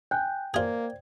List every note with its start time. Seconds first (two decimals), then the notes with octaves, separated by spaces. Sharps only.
0.11 G5 G#5 F#6 G6
0.54 A#3 F4 G#4 C5 D5 G#6